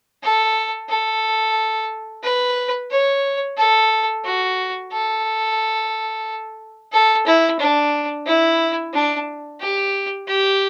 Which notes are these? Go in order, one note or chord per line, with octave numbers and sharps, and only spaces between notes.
A4
A4
B4
C#5
A4
F#4
A4
A4
E4
D4
E4
D4
G4
G4